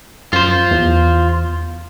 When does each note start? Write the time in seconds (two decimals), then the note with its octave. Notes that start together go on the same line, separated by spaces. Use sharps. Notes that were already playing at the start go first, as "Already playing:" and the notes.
0.33 F#2 F4 C5
0.71 E2